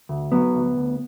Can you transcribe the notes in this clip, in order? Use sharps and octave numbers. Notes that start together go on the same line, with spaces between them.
D2
F#3 B3
D2
D2